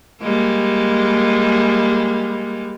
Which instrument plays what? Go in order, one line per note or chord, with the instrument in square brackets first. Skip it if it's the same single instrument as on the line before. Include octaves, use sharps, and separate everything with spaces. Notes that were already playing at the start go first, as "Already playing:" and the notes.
[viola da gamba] G3 G#3 A#3